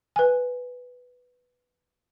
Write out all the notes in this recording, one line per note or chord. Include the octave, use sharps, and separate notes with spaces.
B4 G#5